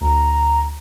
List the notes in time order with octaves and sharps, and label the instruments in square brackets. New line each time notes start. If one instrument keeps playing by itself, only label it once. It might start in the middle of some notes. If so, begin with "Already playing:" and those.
[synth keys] D2 [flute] A#5